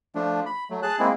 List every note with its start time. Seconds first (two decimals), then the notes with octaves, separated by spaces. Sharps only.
0.15 F3 A3 D4
0.46 B5
0.70 F#3 A3
0.83 G#4 A5 F#6
0.99 G#3 A#3 C4 E4 G#4